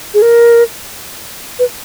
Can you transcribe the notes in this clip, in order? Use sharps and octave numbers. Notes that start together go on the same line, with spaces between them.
G#4
A#4
B4